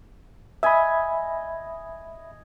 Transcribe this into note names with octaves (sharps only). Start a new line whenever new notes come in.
D#5 E5 G#5 B5